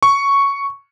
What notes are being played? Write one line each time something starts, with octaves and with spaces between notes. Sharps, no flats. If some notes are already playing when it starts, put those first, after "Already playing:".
C#6